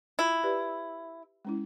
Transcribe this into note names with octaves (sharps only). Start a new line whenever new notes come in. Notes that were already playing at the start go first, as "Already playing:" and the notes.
E4 F4
G4 B4 D5
G#3 C#4 E4